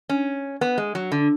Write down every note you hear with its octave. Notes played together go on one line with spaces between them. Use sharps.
C#4
B3
G#3
F#3
D3